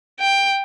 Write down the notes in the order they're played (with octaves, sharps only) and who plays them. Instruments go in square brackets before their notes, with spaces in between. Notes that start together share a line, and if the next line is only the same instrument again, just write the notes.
[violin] G5